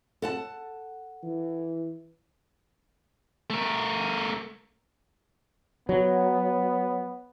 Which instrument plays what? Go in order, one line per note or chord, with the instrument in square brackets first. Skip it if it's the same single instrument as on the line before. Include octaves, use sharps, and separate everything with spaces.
[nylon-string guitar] A4 F#5 A5
[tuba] E3
[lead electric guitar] A3 A#4
[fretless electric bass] F#3 [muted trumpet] B3